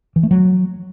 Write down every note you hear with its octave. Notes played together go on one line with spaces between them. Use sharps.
E3
A3
F#3